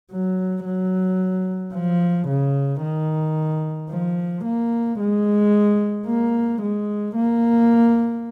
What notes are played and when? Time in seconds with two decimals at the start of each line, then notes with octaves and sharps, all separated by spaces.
0.11 F#3
0.65 F#3
1.74 F3
2.28 C#3
2.82 D#3
3.91 F3
4.44 A#3
4.99 G#3
6.07 A#3
6.62 G#3
7.15 A#3